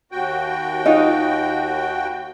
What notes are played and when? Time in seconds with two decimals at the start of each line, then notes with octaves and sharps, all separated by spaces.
0.12 D#2 F#4 G5
0.86 D#4 F4 D#5